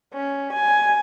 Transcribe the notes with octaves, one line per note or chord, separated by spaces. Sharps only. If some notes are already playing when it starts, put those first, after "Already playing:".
C#4
G#5